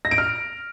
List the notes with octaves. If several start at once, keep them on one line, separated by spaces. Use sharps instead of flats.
A#6
D7
F6